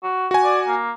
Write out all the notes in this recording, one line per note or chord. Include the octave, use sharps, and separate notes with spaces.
F#4
F#4 G#5
D5
A#3